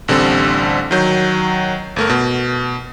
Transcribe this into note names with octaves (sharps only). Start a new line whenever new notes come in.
A1 D3 G3 C4 A4
D#3 F#3 G6
G1 A3 A#4
B2